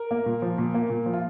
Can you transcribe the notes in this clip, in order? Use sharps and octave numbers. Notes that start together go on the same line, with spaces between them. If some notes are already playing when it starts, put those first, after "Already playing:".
Already playing: A#4
A#3
A#2
F3
A#2
A#3
A#2
F3
F4